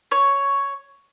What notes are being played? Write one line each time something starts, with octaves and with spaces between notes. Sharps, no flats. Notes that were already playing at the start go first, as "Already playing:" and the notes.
C#5